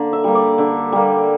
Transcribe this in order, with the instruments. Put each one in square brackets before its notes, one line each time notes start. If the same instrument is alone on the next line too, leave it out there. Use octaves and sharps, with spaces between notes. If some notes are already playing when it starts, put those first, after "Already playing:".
Already playing: [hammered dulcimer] D3 A#3
E5
G3 A#3
D5
D3 E5
G3 A#3